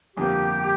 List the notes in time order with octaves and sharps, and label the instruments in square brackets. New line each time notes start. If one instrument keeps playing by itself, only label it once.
[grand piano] G1 F2 D3 A#3 [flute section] G4